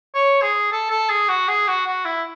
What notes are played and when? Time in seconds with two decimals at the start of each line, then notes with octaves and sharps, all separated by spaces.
0.15 C#5
0.42 G#4
0.72 A4
0.90 A4
1.09 G#4
1.28 F#4
1.48 G#4
1.68 F#4
1.87 F#4
2.05 E4